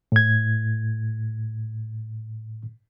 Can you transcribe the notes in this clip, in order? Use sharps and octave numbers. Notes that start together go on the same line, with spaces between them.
A2 G#6